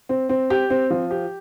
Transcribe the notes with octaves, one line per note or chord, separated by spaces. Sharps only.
C4
C4
G4
C4
F3
G4